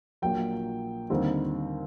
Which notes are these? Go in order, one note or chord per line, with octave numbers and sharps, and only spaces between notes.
A#1 A#2 F#3 G5
D#2 D3 G3 C4 D#4